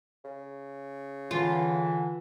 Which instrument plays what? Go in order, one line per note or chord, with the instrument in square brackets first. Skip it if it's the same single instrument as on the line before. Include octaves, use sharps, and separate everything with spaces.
[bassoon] C#3
[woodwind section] D3 E3 [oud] F4